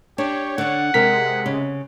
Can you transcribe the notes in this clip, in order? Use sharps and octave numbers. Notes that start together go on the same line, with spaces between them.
D4 G4 C#5
D3 D4 F#5
C3 G#3 G4 A#4 B6
C#3